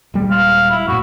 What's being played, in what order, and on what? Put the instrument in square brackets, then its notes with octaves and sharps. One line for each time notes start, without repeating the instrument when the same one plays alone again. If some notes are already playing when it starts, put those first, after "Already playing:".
[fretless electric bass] D#1 G3 G#3
[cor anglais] F5
E4
[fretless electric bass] F#2 A2 [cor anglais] F#4